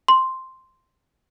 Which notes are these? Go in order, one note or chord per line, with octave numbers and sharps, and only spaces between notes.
C6